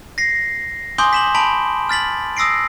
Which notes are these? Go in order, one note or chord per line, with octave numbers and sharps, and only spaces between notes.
A#6 C7
G#5 C6 D6 D#6 G6 G7
B6 E7 F#7
A5 B5 B6 D7 F#7
F6 A6 B6 F#7
D#6 E6 A#6 C7 D7